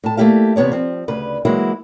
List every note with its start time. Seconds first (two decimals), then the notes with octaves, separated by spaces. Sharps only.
0.04 A2 A5
0.17 A3 A#3 E4 G4 F5
0.56 E2 C3 B3 C#5 D5
0.72 F3 C4
1.08 D2 C#3 B4
1.45 E3 F#3 G#3 A#3 E4 F#4